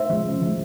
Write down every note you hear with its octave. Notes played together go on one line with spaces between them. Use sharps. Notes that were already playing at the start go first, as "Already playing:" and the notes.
Already playing: C5 E5
F3 G#3
C#3
F3 G#3